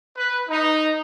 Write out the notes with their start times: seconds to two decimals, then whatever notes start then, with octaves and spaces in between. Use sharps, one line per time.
0.17 B4
0.49 D#4